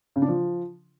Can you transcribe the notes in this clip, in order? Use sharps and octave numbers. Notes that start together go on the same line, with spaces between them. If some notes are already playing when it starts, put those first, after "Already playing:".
C#3
D4
F3